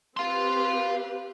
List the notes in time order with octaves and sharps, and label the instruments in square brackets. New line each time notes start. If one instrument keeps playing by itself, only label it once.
[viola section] C4 G4 B4 [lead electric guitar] F5 C6